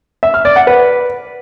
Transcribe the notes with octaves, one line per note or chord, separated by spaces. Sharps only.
E5
F6
D5
F#5
B4